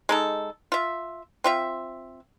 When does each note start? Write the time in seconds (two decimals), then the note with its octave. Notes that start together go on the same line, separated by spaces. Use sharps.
0.09 G#3 D#4 A4
0.72 F4 E5
1.44 C4 F4 E5